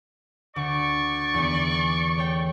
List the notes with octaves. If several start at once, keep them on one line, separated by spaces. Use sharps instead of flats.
D2 D5 C#6
E2 D#3 B3
A3 C#5 G5